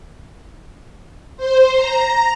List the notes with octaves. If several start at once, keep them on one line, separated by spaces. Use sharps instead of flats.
C5
A#5